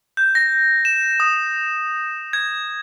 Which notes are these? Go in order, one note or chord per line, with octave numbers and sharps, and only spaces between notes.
G6
A#6
E7
D#6
G#6